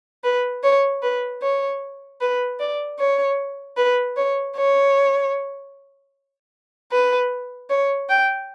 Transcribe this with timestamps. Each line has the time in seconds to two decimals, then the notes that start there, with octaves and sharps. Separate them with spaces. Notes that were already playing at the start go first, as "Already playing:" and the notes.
0.24 B4
0.63 C#5
1.02 B4
1.42 C#5
2.21 B4
2.59 D5
2.99 C#5
3.77 B4
4.16 C#5
4.56 C#5
6.91 B4
7.70 C#5
8.09 G5